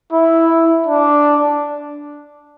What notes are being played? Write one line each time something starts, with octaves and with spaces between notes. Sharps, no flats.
E4
D4